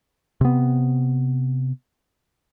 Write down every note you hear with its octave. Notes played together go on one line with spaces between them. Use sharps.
C3 B3